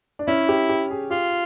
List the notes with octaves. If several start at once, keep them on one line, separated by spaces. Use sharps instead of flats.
D4
C#4 E4
G4
G4
G#4
F4 G4